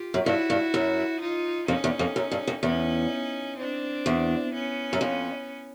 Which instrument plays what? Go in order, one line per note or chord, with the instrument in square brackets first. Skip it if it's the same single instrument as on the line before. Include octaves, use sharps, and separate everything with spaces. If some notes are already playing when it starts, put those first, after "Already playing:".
Already playing: [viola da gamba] F4 G4
[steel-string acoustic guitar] F#2
[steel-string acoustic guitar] G2 [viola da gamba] E4 F#4
[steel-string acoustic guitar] G2
F#2
[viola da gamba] D#4 F4
[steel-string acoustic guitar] F2 [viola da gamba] C#4 D#4
[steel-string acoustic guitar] E2
F2
F#2
G2
F2
[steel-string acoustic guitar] E2 [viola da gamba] C#4 D#4
[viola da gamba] C4 D4
[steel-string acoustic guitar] E2
[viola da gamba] B3 C#4
[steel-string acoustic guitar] F#2
F2